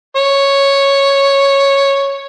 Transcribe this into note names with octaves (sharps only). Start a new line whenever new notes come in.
C#5